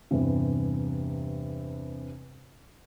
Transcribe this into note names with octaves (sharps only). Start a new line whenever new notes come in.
E2 G2 C3